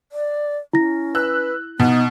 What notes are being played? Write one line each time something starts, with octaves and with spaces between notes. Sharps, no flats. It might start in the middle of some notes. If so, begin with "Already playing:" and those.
D5
C#4 E4 A#6
B4 E6 F#6
B2 B3 D#4